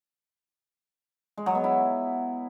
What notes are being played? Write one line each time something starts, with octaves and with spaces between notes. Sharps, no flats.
G#3
F#3
B3
E4